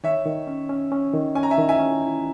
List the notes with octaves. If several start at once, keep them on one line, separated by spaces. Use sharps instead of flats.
D#3 C#5 E5
D#3
C#4
C#4
C#4
D#3
C#4 G#5
A#5
E5 G#5
D#3
E5 G#5
C#4
E4